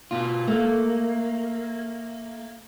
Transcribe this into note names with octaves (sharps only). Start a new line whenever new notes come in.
B2 F4
A3 A#3 A4 F5